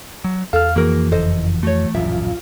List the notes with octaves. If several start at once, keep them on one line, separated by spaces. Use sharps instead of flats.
F#3
E2 A4 F5 F6
F2 E3 A#3 F#4 G#4 A#4
F#1 A4 C5 D#5
A3 F#4 C#5
D1 A#1 F#2 F4 E5